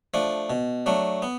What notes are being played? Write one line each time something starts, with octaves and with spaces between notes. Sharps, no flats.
F3 A3 D4
B2
F#3 A3 D4
B3